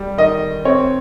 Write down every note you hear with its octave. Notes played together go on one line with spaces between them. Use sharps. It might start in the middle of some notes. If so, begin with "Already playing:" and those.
Already playing: G3
D#3 D#5
C4 C#5